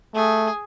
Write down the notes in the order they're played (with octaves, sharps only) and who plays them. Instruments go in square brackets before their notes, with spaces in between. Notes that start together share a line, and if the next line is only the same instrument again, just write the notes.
[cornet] A3 [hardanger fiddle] G#4